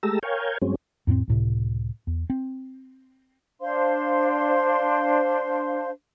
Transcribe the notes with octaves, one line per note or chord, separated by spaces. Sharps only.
G#3 A3 G4 A5 A#5 E6
A#4 C#5 F5 G5 G#5
G2 F#3 G#3 C4 C#4
F2 A2 A#3 C4
C#2 A2 C3
E2
C4
D4 C5 F5 C6